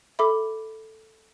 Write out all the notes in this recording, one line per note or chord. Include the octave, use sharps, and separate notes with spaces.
A4 E5 B5 D6